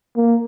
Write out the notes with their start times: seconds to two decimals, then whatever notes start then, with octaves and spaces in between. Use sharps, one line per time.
0.17 A#3